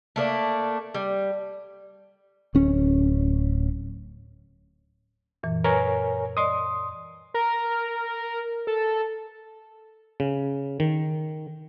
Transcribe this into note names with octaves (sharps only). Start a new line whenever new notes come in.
A3 A#3 D4
G3
D1 C#4
F#2 A#2 E3
A#4 B4 C#5 G#5
D5 D#5 C6 D#6
A#4
A4
C#3
D#3